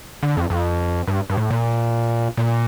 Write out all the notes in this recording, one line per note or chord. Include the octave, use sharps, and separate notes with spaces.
D3
F2
F2
G2
G2
A2
A#2
A#2